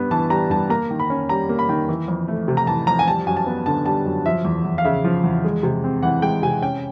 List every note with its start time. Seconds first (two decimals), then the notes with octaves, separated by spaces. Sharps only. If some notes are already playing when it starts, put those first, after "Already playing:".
Already playing: G2 G3 B3
0.11 E3 A5
0.30 G3 A#5
0.50 G2 A5
0.70 A#3 A#5
0.90 D#3
1.00 B5
1.10 C#4
1.29 G3 A#5
1.49 A#3
1.59 B5
1.69 D#3
1.88 E3
2.08 F2
2.28 A3
2.48 C3
2.57 A#5
2.67 E3 A5
2.87 F2 A#5
2.99 G#5
3.07 G3 A5
3.26 F#2 G#5
3.37 A5
3.46 B3
3.66 D3 A5
3.86 G3 A5
4.06 F#2
4.26 F3 E5
4.45 E2
4.65 E2
4.78 F5
4.85 C#3 E5
5.04 F3
5.24 E2
5.44 G#3
5.63 C3
5.84 C4
6.03 E3 F#5
6.22 G#3 G5
6.43 C3 G#5
6.62 C#4 G5